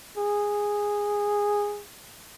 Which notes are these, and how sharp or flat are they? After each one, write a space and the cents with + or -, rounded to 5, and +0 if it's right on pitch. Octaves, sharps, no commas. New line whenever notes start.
G#4 -10